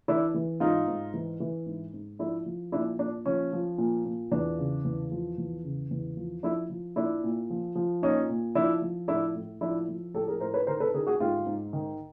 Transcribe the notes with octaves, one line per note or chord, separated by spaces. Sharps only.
E3 D4 E4
E3
G#2 D#4 F4
G#2
E3
E3
G#2
G#2
F3 D4 E4
F3
A#2 D4 E4
A#2 D4
F3 C#4
F3
A#2
A#2
E2 D4
C#3
E2
F3
E2
C#3
E2
F3
F3 D4 E4
F3
A#2 D4 E4
A#2
F3
F3
A#2 C#4 D#4
A#2
F3 D4 E4
F3
A2 D4 E4
A2
F3 D4 E4
F3
A2 G4 A4
G#4 A#4
A2 A#4 C5
B4 C#5
D#3 A#4 C5
A4 B4
D#3 G#4 A#4
F#4 G#4
G#2 F4 G4
G#2
D#3